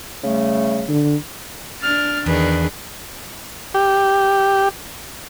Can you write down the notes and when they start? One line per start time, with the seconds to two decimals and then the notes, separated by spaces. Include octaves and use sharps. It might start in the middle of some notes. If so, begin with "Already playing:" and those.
0.24 C#3 G3 A3
0.89 D3
1.82 D4 F6 A6
2.26 E2 D#3 D4 G#4 B4
3.74 G4